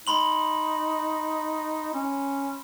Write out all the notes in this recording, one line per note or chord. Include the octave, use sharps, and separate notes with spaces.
D#4 B5 C6 F#7
C#4